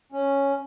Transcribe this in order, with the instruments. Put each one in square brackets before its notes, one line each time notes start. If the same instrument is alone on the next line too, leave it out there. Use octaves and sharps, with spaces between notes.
[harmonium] C#4